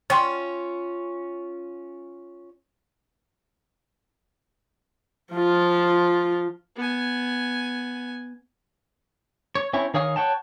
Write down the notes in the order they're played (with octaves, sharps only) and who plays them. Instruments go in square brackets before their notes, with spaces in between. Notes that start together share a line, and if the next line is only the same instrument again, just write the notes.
[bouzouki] C#4 F4 [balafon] C#5 G5 C6
[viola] F3 F4
[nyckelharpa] B3 G#5
[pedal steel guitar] C#5
C4 C#4 E4 C#5
D#3 G#4 C#5 F5 D#6
C#5 F#5 G5 A5